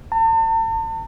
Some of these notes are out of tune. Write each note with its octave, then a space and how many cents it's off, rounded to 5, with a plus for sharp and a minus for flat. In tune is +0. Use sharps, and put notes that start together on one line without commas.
A5 +40